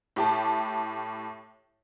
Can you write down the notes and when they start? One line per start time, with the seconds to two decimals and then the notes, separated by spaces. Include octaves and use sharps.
0.16 A2 G4 A5